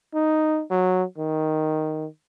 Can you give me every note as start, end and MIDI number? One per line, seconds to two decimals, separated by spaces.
0.15 0.63 63
0.71 1.03 54
1.18 2.06 51